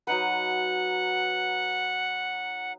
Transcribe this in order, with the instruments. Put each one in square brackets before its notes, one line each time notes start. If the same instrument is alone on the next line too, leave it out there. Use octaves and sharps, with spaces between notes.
[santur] F#3 D#4 B4 [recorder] F#5